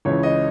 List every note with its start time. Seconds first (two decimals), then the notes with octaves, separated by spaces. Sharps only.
0.05 C#2 C#3 E3 C#5
0.23 D#5